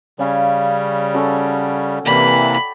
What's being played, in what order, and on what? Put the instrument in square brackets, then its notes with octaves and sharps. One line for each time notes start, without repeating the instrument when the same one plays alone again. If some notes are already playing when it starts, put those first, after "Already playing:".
[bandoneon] C#3 G3 [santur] C#4 F5 G#5
[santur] C#4 F#4 A4
[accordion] C3 E3 A#3 [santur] D5 G5 A5 [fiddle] B5